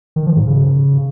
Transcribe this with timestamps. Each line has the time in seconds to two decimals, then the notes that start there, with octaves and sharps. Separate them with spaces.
0.16 D#3
0.26 F3
0.37 G#2
0.47 C#3